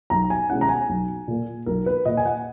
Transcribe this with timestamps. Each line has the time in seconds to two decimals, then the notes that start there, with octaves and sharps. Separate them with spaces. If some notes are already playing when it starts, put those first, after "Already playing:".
0.10 B1 A#5
0.30 G#5
0.50 B2 G#3 C#4 E4 F#5
0.61 A#5
0.69 G#5
0.89 B1
1.28 A#2 A#3
1.66 B1 A#4
1.86 B4
2.05 A#2 A#3 D#5
2.17 G#5
2.26 F#5